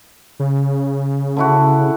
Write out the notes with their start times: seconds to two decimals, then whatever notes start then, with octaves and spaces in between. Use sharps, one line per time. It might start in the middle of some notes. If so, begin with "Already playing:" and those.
0.40 C#3
1.37 D3 E4 F#4